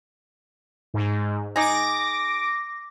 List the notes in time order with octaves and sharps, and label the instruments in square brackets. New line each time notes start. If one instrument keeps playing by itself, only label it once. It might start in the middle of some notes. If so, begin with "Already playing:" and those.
[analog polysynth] G#2
[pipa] D#4 G#4 [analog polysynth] D6 A#6